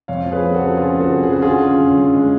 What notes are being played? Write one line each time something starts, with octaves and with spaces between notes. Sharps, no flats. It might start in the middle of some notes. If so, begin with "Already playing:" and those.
F2 C#5 F5
F3
G#4 B4
F3
F#4 A4
C#3
C#3 F4 G#4
F3
F#4 A4
F2
G#4
C#3 F#4
D3 F4 G#4
C#4
F#2
F#2
G#3